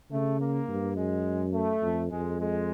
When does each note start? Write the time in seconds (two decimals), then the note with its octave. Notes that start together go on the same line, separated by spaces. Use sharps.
0.11 C#3 A3
0.40 A#3
0.69 G2
0.97 F#2 G#3
1.54 A3
1.82 F2
2.11 F2 G#3
2.41 G#3